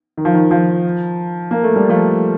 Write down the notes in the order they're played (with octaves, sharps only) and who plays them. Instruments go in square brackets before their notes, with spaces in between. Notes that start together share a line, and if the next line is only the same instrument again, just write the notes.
[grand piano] D#3
F3
D#3
F3
A#3
A3
G3
F3 A3